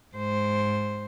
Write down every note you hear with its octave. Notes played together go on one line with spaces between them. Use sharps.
G#2 C5